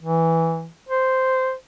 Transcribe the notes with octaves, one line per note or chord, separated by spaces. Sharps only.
E3
C5